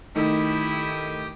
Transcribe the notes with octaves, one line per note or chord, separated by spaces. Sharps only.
D#3 A3 D#4 E4 G4 D#6